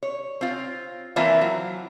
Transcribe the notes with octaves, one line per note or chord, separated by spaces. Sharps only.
C#5
C4 F4
E3 A#3 C4 E4 F4
F#3